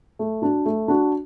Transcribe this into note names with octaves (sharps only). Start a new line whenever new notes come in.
A3
D4 F#4
A3
D4 F#4